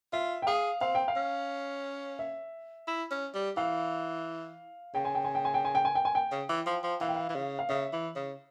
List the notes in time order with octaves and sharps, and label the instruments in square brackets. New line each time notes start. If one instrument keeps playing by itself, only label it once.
[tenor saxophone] F4 [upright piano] E5
[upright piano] G5
[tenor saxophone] G#4 [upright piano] F5
[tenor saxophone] C4 [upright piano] F5
[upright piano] G5
F5
[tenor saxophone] C#4
[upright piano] E5
[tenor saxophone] E4
C#4
G3
[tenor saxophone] E3 [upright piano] F5
[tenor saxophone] C#3 [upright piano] G5
[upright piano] G#5
G5
G#5
G5
G#5
G5
G#5
G5
G#5
G5
G#5
G5
[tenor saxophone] C#3
E3
F3
F3
[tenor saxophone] E3 [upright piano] F5
[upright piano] G5
F5
[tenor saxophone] E3
C#3
[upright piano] F5
[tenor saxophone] C#3 [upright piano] E5
[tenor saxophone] E3
C#3